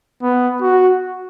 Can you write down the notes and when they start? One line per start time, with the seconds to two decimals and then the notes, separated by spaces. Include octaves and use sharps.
0.23 B3
0.61 F#4